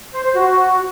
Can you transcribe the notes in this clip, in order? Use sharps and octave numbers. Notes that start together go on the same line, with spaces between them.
C5
C5
F#4